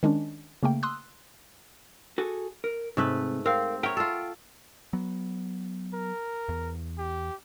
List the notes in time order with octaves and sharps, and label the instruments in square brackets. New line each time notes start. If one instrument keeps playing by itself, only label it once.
[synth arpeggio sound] D#3 G#3 C#4 D4
C#3 A3 A#3 G5
C6 D#6 E6 F#6
[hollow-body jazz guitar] F#4 G#4 A4
A#4
[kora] G#2 A3 B4 [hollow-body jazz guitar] C3
[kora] C4 [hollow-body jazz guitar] A#4 F5
[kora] A#4 C#5 [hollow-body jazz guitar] E5 F#5 G5
[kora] F4 A4
[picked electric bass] F#3 B3
[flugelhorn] A#4
[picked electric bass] E2
[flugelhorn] G4